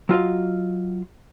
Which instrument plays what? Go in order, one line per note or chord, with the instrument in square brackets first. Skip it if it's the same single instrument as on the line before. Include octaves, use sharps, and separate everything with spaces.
[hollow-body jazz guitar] F#3 F4 D#5 F5